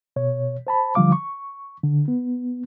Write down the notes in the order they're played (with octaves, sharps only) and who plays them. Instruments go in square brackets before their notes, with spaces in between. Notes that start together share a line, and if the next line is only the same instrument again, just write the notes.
[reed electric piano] B2 C#5
C5 A5 B5
D3 F3 G3 F5 D6
C#6
D3
B3